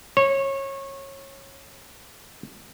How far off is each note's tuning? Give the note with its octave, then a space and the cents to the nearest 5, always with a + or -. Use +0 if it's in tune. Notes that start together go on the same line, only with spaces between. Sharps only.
C#5 -25